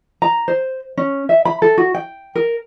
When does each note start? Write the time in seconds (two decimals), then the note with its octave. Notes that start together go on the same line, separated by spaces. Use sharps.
0.22 A#5
0.48 C5
0.97 C#4
1.29 E5
1.45 B5
1.62 A4
1.78 F#4
1.94 G5
2.35 A#4